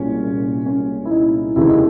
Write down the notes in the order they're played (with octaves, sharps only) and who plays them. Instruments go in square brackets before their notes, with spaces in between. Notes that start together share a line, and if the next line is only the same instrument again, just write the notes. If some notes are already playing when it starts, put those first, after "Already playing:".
Already playing: [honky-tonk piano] C2 A#2 G#3 C#4
C#4
E4
D#4
F1 D#2 C#3 E3 G#3 E4
D#4